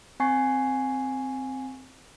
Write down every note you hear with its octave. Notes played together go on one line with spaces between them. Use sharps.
C4 G#5 C#6 C7